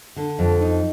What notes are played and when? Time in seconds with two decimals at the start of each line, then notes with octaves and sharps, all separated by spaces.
0.16 D3
0.39 F2
0.61 D#4